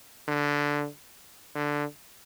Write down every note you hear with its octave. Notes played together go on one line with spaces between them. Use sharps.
D3
D3